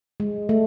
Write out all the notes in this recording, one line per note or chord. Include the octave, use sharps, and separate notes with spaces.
G#3
A3